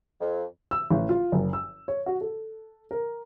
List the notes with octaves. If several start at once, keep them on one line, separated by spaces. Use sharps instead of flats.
F2
E6
A1
F4
F#1
E6
C#5
F#4
A4
A#4